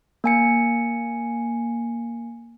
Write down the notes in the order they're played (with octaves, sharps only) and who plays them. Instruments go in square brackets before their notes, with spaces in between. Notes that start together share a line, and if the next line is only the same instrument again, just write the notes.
[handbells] A#3 G#5 C#7